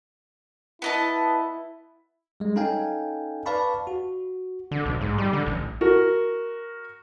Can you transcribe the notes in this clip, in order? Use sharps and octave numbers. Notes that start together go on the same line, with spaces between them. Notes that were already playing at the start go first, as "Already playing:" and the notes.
B3 E4 D#5 A5
G3 G#3
C#4 D#4 A4 F5 G5 G#5
B4 D5 F5 A5 B5 C#6
F#4
D3
B1
G#2
G3
D3
A1
F#4 A#4